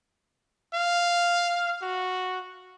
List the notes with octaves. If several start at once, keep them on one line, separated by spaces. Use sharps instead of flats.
F5
F#4